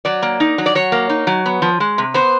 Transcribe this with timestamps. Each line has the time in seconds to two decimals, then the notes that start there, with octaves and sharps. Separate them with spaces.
0.05 F#3 D5
0.22 A#3
0.40 D#4
0.58 F#3
0.66 D5
0.75 F#3 C#5
0.92 A#3
1.09 D#4
1.27 F#3
1.46 B3
1.62 F3
1.80 G#3
1.98 C3
2.14 B3 C5